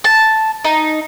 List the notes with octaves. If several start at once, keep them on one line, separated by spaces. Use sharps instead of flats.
A5
D#4